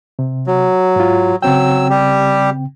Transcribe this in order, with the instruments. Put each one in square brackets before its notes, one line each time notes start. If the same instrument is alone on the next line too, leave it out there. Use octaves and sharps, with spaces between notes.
[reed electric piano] C3
[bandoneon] F#3
[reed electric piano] G#2 F4
[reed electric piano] C#3 C4 G5 [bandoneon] F#3 E6
[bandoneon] G3 G4